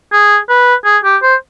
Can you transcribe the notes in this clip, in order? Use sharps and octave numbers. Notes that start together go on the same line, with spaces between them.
G#4
B4
G#4
G4
C5